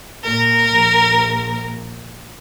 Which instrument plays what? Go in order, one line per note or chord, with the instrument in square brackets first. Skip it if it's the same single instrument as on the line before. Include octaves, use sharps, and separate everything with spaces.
[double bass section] A#2 [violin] A#4
[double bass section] A#1